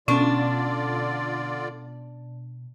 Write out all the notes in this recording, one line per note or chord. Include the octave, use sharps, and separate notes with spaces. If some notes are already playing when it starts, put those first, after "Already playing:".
B2 D3 C#4 D4 F4 D5